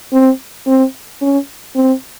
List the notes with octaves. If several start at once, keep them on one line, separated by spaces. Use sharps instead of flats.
C4
C4
C#4
C4